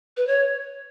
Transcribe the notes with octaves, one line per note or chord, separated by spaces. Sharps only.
B4
C#5